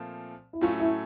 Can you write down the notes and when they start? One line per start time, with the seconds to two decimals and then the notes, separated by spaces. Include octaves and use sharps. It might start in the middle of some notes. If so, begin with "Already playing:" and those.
Already playing: A#2 F3 A3 C4
0.53 E4
0.61 A2 F#3 A3 C#4 F4
0.80 E4